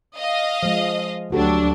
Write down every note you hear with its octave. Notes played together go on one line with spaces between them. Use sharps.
D#5 F5
F3 G#3
D2 F#3 D4 F#4 G4 A4